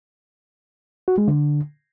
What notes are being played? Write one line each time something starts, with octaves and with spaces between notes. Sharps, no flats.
F#4
G#3
D3